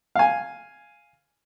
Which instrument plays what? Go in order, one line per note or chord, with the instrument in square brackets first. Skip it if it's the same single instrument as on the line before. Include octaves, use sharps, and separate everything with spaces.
[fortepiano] F5 G#5